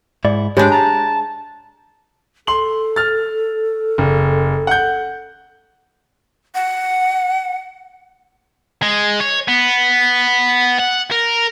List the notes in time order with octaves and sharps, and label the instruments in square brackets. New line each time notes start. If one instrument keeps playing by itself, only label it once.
[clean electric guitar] G#2 E4 [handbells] D5
[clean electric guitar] G#2 [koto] G#3 D4 [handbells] G4 C#5 B5 [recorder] G6
[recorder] A5 [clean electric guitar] A#5
[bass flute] A4 [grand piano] C6 F#7
[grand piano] F6 A6
F#1
F#5 G6
[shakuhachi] F#5
[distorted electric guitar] G#3
C#5
B3
F#5
A#4